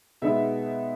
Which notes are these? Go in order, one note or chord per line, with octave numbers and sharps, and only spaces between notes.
B2 G#3 B3 D#4 E5